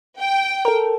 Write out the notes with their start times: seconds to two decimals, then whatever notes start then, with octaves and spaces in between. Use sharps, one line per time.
0.19 G5
0.65 A4 A#4